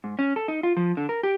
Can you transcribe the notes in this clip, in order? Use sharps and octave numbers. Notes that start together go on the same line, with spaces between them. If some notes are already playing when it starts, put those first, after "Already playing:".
G#2
C#4
A4
D#4
F4
F3
D3
A#4
G4